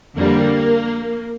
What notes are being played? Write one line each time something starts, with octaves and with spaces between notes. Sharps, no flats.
F2 D3 G3 A#3